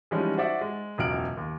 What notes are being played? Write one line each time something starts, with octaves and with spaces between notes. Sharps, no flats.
E3 F3 G3 G#3 C#4 D#4
F#4 C5 D5 E5 F#5
G#3
E1 C#2 F#3 F6 D7 F#7
D#2